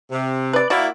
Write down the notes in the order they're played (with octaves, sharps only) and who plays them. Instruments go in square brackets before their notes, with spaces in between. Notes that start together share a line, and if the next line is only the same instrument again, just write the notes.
[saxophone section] C3
[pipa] B4 D5
[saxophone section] A#3 E4 [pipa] F#4 D5